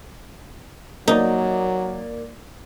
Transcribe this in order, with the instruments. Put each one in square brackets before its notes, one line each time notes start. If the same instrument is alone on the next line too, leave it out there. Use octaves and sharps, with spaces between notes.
[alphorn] F#3 [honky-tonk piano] A#3 D5 [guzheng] D#4